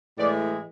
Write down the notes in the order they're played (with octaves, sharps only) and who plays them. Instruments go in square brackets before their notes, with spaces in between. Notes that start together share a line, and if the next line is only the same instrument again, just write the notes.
[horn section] A2 E3 G#3 D5